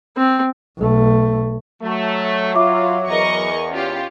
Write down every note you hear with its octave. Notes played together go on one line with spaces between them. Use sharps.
C4
B1 A3
F#3 A3
F4 E5 D6
E2 A#4 D#5 C#6
C#4 F4 G4